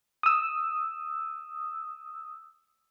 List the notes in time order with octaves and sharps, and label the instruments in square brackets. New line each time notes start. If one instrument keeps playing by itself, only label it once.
[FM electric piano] D#6 E6